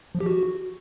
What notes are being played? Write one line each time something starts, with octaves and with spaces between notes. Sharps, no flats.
F3
G4
F#4